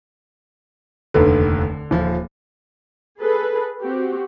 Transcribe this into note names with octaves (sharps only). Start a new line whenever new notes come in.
F1 D#2 D3 B4
D#1 F3
G#4 A4 B4
C4 F#4 G4